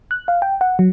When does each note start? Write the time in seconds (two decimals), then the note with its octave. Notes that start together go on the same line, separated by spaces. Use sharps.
0.11 F#6
0.28 F5
0.42 G5
0.61 F#5
0.79 F#3